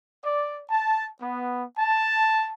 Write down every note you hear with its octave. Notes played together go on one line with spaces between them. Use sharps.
D5
A5
B3
A5